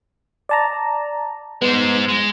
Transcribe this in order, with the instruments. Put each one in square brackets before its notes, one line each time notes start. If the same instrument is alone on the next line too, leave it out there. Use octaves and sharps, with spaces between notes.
[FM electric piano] D5 A5 A#5
[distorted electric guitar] G#3 C5 [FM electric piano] B3
[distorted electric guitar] G#3